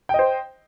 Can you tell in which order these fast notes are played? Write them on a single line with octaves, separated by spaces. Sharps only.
G5 D#5 C5